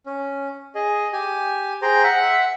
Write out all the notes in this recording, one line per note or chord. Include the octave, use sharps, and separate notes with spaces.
C#4
G#4 D#5
G4 G#5
G#4 C5 G5 A#5
E5 F#5